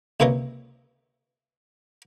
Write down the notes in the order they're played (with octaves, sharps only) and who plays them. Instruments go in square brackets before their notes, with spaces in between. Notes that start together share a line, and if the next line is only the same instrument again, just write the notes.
[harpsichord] C#2 C3 A#3 B4 C#5 D#5